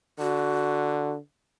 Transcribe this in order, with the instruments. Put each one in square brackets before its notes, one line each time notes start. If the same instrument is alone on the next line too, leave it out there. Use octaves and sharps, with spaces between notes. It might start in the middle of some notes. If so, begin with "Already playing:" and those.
[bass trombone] D3 [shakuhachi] F#4